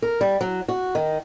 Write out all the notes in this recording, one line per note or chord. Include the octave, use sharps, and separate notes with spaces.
A#4
G3
F#3
F#4
D#3